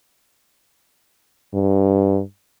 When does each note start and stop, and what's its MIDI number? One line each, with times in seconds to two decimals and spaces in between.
1.54 2.21 43